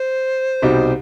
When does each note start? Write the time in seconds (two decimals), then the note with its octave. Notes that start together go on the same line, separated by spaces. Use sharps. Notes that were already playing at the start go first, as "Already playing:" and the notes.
Already playing: C5
0.62 C2 B2 G3 D#4 G4